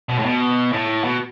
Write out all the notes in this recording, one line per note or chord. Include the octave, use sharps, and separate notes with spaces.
B2
A2
B2
A2
B2